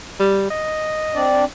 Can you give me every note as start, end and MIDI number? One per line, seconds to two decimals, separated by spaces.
0.20 0.47 55
0.50 1.26 75
1.15 1.44 60
1.15 1.44 62
1.15 1.44 74